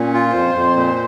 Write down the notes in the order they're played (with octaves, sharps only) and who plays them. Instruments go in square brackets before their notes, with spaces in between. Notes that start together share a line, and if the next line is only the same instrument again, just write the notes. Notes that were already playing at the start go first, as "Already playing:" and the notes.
Already playing: [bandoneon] A#2 [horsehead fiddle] C#4
[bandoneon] F4
[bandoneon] F2 [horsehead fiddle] C5
[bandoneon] F2
A#2